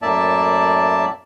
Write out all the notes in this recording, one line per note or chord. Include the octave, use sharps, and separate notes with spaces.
F#2 A2 A#3 D5 E5 A5